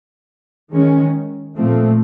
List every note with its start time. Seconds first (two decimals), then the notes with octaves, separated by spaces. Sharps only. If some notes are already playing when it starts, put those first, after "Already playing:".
0.72 D#3 G#3 C#4
1.56 A#2 F3 A3 C4